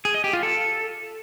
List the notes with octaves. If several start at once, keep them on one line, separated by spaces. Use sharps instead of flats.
G#4
D#5
G4
F4
A4